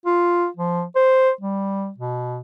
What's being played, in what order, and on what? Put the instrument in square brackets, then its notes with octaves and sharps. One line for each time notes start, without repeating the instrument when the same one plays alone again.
[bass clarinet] F4
F3
C5
G3
B2